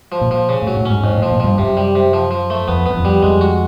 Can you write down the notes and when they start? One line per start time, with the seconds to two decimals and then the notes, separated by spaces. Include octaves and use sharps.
0.12 F3
0.21 A#2
0.31 F3
0.49 C#3
0.62 A2
0.67 F#3
0.77 A2
0.85 G#2 C#4
1.04 F2 G#2
1.17 A2
1.22 F3
1.32 A#2
1.40 G2 F3
1.58 F#2 C3
1.77 G3
1.95 C3
2.13 F3
2.31 F3
2.50 A3
2.68 F2 B3
2.86 F#2 B3
2.96 F2
3.05 G3
3.22 F2 G#3
3.41 F#4